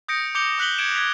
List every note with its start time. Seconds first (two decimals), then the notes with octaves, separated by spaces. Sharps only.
0.08 D#6 G6 A#6 C#7 D7
0.35 D6 G6 C#7 F7 G7
0.58 D#6 F#6 B6 F#7 G7
0.78 G#6 C#7 D7 E7
0.95 G#6 B6 F7